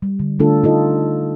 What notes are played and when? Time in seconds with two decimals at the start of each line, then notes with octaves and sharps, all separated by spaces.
0.02 G3
0.20 D3
0.39 D3 A3 D4 F4 A4
0.63 D#4 F4 A4 D#5